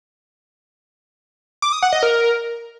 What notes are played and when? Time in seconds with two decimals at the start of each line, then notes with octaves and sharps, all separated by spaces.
1.62 D6
1.72 D#6
1.82 F#5
1.93 D#5
2.03 A#4